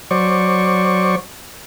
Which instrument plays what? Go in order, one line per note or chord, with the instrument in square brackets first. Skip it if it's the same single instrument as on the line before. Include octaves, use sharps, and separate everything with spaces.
[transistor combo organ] F#3 C5 D5 C#6